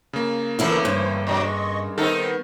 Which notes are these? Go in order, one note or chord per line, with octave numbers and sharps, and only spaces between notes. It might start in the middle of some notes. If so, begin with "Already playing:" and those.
C#3 A#3
A2 D3 E3 A3 B3 E4 F4 A#4
G2 C5 C#5
B2 F#3 D4 D#5 C#6
G#3
D#3 B3 C4 D#4 A4